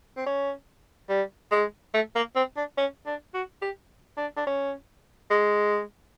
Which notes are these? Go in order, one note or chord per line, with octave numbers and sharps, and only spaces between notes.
C4
C#4
G3
G#3
A3
A#3
C4
D4
C#4
D4
F#4
G4
D4
D4
C#4
G#3